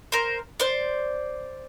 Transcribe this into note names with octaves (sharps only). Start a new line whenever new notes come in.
A#4 C5
C5 D5